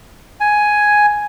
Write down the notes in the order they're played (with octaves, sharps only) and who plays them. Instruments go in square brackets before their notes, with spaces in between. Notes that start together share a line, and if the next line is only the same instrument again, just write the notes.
[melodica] G#5